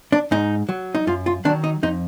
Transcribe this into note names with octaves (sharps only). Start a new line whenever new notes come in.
D4
G#2 D#4
F#3
D#4
F#2 F4
F4
D#3 F#3 D4
D#4
F2 D#4